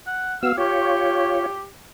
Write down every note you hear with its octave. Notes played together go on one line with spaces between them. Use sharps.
F#5
B3 F#4 F5 E6
F4 G4 C#5